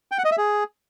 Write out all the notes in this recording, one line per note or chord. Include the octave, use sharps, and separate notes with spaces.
G5
F#5
D#5
E5
G#4